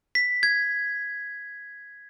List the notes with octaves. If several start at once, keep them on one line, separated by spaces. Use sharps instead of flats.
B6
G#6